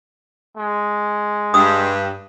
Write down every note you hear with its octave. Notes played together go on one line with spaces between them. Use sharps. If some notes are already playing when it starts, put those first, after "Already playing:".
G#3
G2 D#6 E6